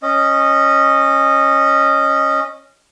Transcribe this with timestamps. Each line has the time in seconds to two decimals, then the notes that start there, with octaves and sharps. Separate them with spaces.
0.03 C#4 D#5